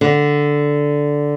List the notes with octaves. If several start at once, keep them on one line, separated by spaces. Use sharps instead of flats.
D3